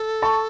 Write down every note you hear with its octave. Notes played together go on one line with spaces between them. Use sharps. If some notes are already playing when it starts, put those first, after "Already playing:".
Already playing: A4
A5 C#6